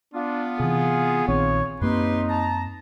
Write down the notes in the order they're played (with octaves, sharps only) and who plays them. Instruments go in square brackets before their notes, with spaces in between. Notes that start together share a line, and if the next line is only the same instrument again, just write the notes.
[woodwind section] B3 F4 [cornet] D4
[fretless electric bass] C3 E3 [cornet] G#4
[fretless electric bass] A#1 D#3 C4 [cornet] C#5
[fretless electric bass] F#2 A#3 C4 [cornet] D#4 [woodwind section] G4 B4 C6
[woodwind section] A5 A#5